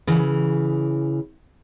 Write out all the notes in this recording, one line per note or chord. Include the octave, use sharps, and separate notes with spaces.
C#3 E3